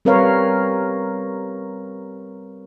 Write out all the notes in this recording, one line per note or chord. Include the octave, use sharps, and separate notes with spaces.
G3 C4 A#4 B4 C#5 F5